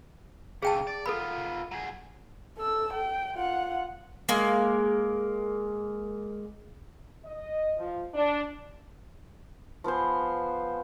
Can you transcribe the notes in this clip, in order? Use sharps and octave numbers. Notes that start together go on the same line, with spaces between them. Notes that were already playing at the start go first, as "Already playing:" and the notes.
C#3 A3 G#4 G5 A5
D5
B3 F4 A4 A#4 B5
F#3 G#4
A4 E6
G5
F4 F#5
G#3 A#3
D#5
F3
D4
F3 B3 G#4 C5